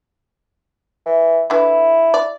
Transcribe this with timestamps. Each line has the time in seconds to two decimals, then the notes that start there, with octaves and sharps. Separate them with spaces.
1.06 E3
1.50 D3 E3 E4
2.14 D5